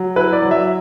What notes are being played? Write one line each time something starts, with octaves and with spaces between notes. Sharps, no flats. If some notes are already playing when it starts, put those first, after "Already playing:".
Already playing: F#3
E4 B4
D5
F#3
E5